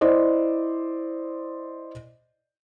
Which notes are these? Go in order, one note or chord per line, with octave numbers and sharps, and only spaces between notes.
E4 C5 D5 D#5